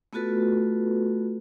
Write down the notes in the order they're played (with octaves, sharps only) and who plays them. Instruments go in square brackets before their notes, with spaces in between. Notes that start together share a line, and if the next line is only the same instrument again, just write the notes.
[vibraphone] A3 B3 F4 F#4 A4 B4